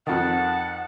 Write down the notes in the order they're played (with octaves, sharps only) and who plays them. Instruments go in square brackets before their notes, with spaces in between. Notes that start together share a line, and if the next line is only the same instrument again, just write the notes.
[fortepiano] F2 D#3 [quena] F#5 [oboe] A5